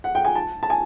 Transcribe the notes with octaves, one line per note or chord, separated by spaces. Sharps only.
F#5
G5
G#5
A5
A5
G#5